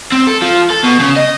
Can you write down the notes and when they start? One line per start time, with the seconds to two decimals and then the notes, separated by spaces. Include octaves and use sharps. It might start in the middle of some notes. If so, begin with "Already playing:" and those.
0.12 C4
0.27 A4
0.42 F3
0.70 A4
0.83 B2
0.99 C#3
1.16 D#5